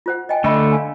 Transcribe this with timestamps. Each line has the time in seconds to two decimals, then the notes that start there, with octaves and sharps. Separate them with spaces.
0.06 F4 C5 F#5
0.29 D#5 G5 G#5
0.44 D3 A3 D#5 E5 B5
0.72 D5 F5 G#5